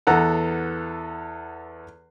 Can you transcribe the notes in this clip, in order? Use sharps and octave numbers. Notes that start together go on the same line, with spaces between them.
E2 B3 A4 F#5 A#5